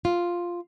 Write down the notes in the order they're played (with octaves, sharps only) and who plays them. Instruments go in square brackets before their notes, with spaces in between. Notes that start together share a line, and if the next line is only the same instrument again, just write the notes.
[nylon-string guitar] F4